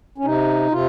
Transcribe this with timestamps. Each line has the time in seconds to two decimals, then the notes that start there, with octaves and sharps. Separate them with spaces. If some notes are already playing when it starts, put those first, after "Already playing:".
0.18 C#4
0.25 C3 D#4
0.71 C3 F4